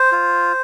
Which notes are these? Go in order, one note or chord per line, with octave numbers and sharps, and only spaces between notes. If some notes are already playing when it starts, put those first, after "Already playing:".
Already playing: C5
F4